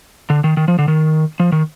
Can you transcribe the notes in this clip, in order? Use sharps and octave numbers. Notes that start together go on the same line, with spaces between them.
D3
D#3
D#3
F3
D3
D#3
F3
D#3